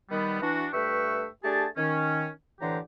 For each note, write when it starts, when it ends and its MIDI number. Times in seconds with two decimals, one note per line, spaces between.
0.11 0.41 51
0.11 0.41 55
0.11 0.41 59
0.42 0.67 52
0.42 0.67 62
0.42 0.67 66
0.73 1.26 43
0.73 1.26 57
0.73 1.26 71
0.73 1.26 76
0.73 1.26 79
0.73 1.26 85
1.44 1.66 57
1.44 1.66 62
1.44 1.66 67
1.44 1.66 68
1.44 1.66 81
1.77 2.28 51
1.77 2.28 61
2.61 2.78 45
2.61 2.78 50
2.61 2.78 52
2.61 2.78 67
2.61 2.78 72
2.61 2.78 82